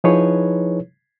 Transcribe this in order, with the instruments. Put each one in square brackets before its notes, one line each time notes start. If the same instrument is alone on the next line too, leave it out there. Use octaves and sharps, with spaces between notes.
[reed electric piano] F3 D#4 E4 G#4 B4 C#5